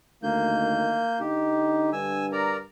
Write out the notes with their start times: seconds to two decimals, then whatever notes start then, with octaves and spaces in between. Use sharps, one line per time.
0.23 D2 D#3 A#3 G6
1.20 D3 D#4 G4
1.93 G2 G#5 E6
2.32 A#4 D5 A#5